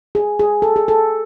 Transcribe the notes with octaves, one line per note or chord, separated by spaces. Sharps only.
G#4
G#4
A4
G#4
A4